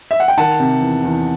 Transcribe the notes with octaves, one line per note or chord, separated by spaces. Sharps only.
E5
F#5
G5
D#3 F#5 A5
C3
E2
E2